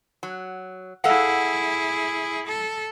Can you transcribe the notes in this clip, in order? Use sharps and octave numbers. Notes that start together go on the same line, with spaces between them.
F#3
E4 G#4 A4 F5 F#5
A4